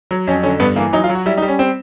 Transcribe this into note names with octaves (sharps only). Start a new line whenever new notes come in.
F#3
F2 C#4
D3 C#4
G2 B3
E3 A#3
F#3 D#4
F4
F#3
F#4
G3 E4
D#4
G3
C#4
C4